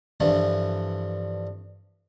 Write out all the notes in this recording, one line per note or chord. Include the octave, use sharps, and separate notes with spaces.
G2 D3 E3 F3